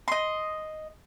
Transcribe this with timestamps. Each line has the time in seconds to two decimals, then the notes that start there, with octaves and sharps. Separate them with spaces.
0.08 D#5 C6